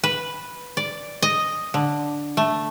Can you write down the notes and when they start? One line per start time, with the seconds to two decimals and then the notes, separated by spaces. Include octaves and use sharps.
0.04 B4
0.77 D5
1.22 D#5
1.74 D3
2.37 A3